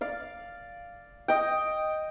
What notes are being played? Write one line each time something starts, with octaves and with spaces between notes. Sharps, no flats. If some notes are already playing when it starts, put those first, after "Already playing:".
D5 F5
D#5 G5